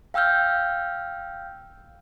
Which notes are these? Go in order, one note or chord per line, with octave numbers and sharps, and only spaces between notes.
F5 G5 E6 F6 G6